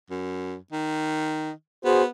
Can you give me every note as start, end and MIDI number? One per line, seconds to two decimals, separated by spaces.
0.10 0.56 42
0.72 1.51 51
1.85 2.07 59
1.85 2.02 66
1.85 2.02 68
1.85 2.02 72